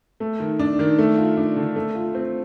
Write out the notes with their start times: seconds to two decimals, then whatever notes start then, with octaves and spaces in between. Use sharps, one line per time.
0.20 A3
0.40 D#3
0.59 D4
0.79 D#3
0.99 A3
1.18 F4
1.37 D4
1.56 D3
1.76 A3
1.95 F4
2.15 C4